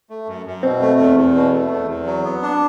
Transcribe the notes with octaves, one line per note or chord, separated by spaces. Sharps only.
A3
F#2
F#2
B2 C4
A3
E2
E2
B2
A3
E2
E2
F#3
B3
D4